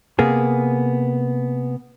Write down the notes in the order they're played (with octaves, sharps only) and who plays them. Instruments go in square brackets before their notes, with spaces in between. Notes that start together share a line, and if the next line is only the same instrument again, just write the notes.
[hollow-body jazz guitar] C3 A#3 B3 G#4